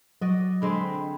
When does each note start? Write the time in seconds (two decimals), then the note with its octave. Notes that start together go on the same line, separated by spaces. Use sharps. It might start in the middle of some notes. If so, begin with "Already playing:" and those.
0.22 F#3 F#4 D5 D#5
0.62 D3 G#3 C4 B5